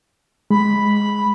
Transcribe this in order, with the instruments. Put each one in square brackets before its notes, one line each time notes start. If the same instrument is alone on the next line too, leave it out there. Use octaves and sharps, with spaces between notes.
[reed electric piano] G#3 [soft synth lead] B5